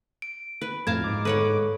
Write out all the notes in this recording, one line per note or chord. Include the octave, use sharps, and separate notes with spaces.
D7
B4
F2 A2 F5 A5 A#5 G#6
G#2 D6
A4 B4 C#5 F#5